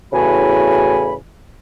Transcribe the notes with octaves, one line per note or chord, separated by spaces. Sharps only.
E2 A2 C#3 F#4 G#5 B5